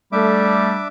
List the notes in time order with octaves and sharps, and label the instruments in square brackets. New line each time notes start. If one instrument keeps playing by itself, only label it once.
[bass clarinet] G3 [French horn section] A3 [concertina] D4 E5 D6